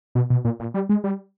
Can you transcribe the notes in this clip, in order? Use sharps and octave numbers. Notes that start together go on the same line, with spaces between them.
B2
B2
A#2
A#2
G3
G#3
G3